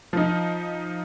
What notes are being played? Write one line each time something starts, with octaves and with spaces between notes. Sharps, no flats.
F3 D#4